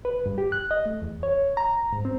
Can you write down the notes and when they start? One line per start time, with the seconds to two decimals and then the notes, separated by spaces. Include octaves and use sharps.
0.05 B4
0.26 G2
0.38 G4
0.52 F#6
0.71 D#5
0.86 A3
1.02 E2
1.23 C#5
1.57 A#5
1.93 G#2
2.05 C4